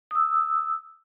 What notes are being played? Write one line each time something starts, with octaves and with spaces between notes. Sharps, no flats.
D#6 E6